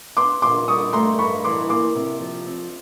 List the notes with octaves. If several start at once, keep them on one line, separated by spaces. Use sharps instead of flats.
B3 C6 D6
A#2 C6 D6
G3 C#6 D#6
A3 A#5 C6
G2 B5 C#6
E3 C6 D6
A#3 C6 D6
C3
F3
C4